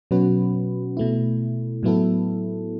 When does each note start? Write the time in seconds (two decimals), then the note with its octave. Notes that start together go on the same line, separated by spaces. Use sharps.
0.11 B2 F#3 C#4 F#4 B4
0.97 B2 A3 E4
1.83 A2 F#3 B3 E4 A4